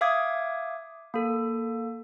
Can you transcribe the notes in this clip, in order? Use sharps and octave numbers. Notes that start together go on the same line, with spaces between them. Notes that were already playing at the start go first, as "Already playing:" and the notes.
E5 F5 D6 D#6 G#6
A#3 A4